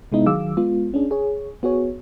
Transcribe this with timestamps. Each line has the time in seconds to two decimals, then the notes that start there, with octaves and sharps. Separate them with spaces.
0.12 C3 G#3 B3 D#4 E4
0.26 D#3 F#3 G#4 F5 D6 E6
0.57 G#3 B3 F4
0.94 C#4 D4 G#4
1.11 G#4 C#5
1.63 B3 F#4 G#4 C#5